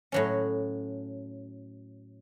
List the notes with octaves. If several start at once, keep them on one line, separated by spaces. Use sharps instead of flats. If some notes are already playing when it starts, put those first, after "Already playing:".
A2 F#3 C#4